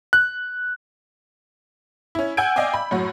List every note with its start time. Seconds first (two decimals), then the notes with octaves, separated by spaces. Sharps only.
0.13 F#6
2.15 C#4 E4
2.37 F#5 G#5 E6 G6 G#6 D7
2.56 D5 D#5 F5 G5 G#5 D6
2.74 B5
2.91 F#2 A2 F#4